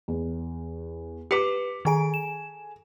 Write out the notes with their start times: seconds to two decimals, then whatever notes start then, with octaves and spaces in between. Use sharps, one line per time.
0.08 E2
1.31 G4 B4 D6 B6 C#7
1.85 D#3 G#4 A4 G#5 A#5 D7
2.14 E7